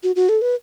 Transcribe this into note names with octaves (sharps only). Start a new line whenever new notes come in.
F#4
F#4
A4
B4